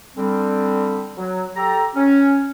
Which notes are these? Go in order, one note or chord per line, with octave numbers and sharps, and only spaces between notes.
D3 G3 C4
F#3
G4 A4 A#5
C#4